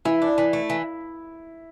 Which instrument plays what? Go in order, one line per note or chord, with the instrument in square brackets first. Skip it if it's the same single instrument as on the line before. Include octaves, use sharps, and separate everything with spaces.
[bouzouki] E3 [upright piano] E4
[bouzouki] D4
E3
A3
E3